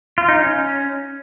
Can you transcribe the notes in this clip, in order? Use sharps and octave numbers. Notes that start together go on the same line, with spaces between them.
F4
D#4
C#4